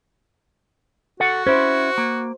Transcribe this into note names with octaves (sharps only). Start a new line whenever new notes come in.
F#4 A4 F#5
C#4 E4 C5
A#3